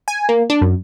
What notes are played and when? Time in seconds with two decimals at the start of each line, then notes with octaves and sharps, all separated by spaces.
0.08 G#5
0.29 A#3
0.50 D4
0.61 F#2